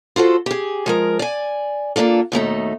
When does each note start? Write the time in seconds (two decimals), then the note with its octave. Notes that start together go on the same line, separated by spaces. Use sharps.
0.16 F4 F#4 A4 C5
0.46 G4 G#4
0.86 F3 G#3 A#4
1.19 D5 G#5
1.96 A#3 B3 D4 F4 A4
2.32 D#2 B2 A3 D#4